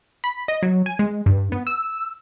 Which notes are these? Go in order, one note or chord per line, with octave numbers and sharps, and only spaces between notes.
B5
D#5
F#3
G#5
G#3
G2
B3
E6